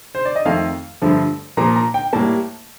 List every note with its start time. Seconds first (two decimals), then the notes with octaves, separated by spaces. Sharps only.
0.15 C5
0.25 D5
0.36 D#5
0.46 F2 D#3 A3 F5
1.01 G2 D3 F3 A3
1.57 A#2 F3 A#3 A#5
1.76 A#5
1.94 G5
2.13 A2 G3 A#3 A5